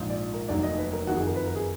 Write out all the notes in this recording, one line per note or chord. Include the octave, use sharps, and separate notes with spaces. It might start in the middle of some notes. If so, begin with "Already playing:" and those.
Already playing: A#1 G#2 F3
D5
A#4
F1 D#2 D#3 F#3 D5
D#5
B4
A#4
F#1 F2 D#3 F#4
G#4
A#4
B4
A#4
G#4